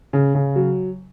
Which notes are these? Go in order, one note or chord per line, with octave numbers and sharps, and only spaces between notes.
C#3
C#3
F#3